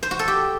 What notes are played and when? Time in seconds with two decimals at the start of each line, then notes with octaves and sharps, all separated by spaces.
0.03 C5
0.11 F#4
0.19 A4
0.28 G4